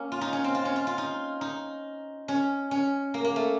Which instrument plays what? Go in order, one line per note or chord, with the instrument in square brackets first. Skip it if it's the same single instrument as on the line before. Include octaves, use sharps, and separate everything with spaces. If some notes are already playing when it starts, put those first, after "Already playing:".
Already playing: [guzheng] A#3 C#4
F4
D#4
C#4
C4
F4
C#4
F4
F4
D#4
D#4
C#4
C#4
A#3
A#3
A3